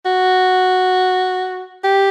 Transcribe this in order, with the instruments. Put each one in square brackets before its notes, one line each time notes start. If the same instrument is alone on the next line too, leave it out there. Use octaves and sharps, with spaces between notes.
[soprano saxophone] F#4
G4